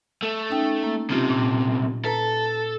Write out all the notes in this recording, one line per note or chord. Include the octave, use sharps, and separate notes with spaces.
A3
C#4 D#4 G5
A#3
B1 C3 C#4 F4 G4
A#2
A4 B4 A#5